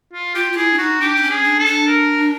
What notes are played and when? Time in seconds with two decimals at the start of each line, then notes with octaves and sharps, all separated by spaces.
0.13 F4
0.35 F4 G4
0.53 F4
0.57 E4 G#4
0.73 D4
0.78 D#4 F#4
1.01 D4 G4
1.16 D4
1.23 C#4
1.30 G#4
1.44 D4
1.59 A4
1.66 D4
1.88 A#4